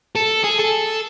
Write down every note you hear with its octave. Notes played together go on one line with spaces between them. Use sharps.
A4
G#4
A4